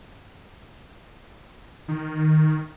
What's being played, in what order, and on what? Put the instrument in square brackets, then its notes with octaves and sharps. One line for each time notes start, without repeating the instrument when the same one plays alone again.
[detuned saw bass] D#3